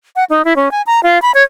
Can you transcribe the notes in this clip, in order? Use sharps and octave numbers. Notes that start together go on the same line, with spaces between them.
F#5
D#4
E4
C#4
G#5
A#5
F4
B5
C#5